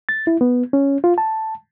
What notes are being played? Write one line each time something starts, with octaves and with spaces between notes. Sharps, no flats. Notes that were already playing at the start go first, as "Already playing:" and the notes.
A6
E4
B3
C#4
F4
A5